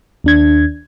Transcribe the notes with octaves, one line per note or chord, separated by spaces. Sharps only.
D#2 D4 G#6